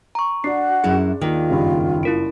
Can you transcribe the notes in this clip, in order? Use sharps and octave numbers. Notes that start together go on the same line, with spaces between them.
A#5 C#6
D4 F#4 C7
F#2 E4 G#4 F#5
D#2 D#3 F4
F#1 G2
E4 A#4 D7